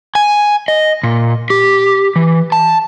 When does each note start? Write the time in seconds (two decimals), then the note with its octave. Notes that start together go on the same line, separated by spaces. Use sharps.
0.15 G#5
0.68 D#5
1.03 A#2
1.50 G4
2.16 E3
2.52 A5